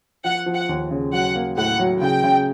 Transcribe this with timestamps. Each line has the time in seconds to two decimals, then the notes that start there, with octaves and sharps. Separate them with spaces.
0.24 F3 F#5
0.46 F3
0.54 F#5
0.69 D#2
0.91 C#3
1.13 F#3 F#5
1.35 A#3
1.57 A2 F#5
1.79 F#3
2.02 C#3 G5
2.24 C#3